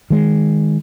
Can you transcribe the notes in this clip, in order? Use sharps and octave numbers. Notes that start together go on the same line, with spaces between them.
D#3 G#3